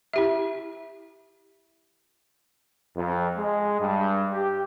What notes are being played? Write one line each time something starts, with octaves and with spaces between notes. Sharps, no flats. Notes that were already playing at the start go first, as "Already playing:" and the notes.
E4 G4 E5
F2
G#3
G2
G4